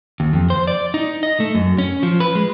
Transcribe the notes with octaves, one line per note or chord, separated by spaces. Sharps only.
D#2
F2
C5
D5
D#4
D#5
A3
F#2
C#4
F3
B4
G#3